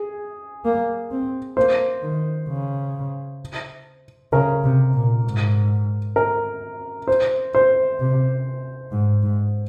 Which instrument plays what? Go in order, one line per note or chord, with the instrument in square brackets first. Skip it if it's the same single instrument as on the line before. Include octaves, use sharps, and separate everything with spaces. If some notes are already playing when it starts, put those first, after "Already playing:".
Already playing: [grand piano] G#4
[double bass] A#3
C4
[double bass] A#3 [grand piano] C5
[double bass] D#3
C#3
[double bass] C#3 [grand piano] A#4
[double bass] C3
A#2
G#2
[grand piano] A#4
C5
C5
[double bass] C3
G#2
G#2